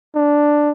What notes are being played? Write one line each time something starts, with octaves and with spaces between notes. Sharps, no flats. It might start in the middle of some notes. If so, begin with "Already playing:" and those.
D4